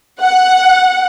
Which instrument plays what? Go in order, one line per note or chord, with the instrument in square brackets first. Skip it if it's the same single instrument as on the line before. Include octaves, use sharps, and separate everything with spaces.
[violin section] F#5